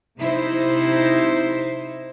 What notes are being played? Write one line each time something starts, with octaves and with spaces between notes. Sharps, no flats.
C3 D#4 E4 C5